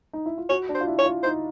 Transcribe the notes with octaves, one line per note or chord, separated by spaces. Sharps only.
D#4
E4
F4
F#4 C#5
D4
C5
F4
E4
C#5
F4
D#4 C5